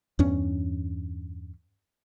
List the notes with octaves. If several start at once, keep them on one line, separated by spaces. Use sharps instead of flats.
E2 G2 C#4